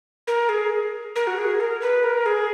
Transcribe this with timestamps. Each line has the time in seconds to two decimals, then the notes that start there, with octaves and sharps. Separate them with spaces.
0.27 A#4
0.49 G#4
1.16 A#4
1.27 F#4
1.38 G#4
1.60 A#4
1.81 B4
2.03 A#4
2.26 G#4